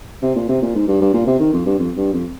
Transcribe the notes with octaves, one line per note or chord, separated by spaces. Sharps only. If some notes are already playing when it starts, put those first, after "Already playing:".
C3
A#2
C3
A#2
G#2
G2
G2
A#2
C3
D#3
F2
G2
F2
G2
F2